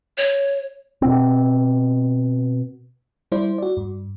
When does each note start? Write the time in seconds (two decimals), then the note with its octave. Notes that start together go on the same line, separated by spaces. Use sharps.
0.18 C#5
1.02 B2 C4
3.32 G3 E4 C5 D5
3.58 F#4 D5
3.77 G2